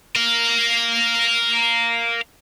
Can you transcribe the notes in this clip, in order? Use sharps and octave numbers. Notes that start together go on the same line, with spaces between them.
A#4 F5